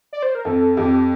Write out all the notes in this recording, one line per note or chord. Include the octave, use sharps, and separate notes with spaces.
D5
C5
A#4
F2 A4
F2 G4